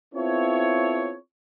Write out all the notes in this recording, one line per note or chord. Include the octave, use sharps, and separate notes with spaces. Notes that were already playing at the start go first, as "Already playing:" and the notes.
B3 C4 E4 F4 A4 C#5